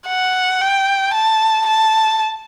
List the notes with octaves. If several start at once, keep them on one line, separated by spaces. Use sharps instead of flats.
F#5
G5
A5
A5